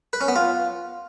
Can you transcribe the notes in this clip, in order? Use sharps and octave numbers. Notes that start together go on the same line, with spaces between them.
B4
C#4
B3
F4